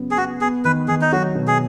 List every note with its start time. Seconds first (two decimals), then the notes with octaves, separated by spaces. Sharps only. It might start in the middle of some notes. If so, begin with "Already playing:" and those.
Already playing: C#3 F#3 B3
0.11 G#4
0.17 B3 F#4
0.41 B3 G#4
0.65 D#3 B4
0.88 D#3 G#4
1.01 D#4
1.12 F#3 F#4
1.35 B2
1.47 G#4